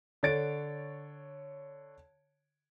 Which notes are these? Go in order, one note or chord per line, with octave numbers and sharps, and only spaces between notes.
D3 C#5 A6 D7